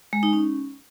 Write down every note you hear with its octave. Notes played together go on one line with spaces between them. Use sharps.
G#3
D#4
C#4